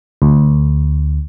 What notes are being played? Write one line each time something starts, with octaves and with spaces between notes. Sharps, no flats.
D2